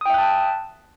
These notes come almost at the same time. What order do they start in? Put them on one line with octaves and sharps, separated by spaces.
D#6 G5 E5 F#6 A5